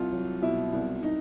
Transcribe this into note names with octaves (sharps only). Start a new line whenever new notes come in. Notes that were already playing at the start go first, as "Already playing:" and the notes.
Already playing: C2 F4
F#3
B2 E4
C2
D#4